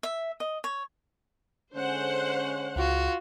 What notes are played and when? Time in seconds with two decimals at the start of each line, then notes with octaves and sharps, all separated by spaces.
0.03 E5
0.40 D#5
0.64 C#5
1.74 D3 G#3 C#4 C5 F#5
2.76 C#2 F4 F#4